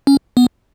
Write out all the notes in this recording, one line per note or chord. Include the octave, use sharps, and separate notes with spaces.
C#4
B3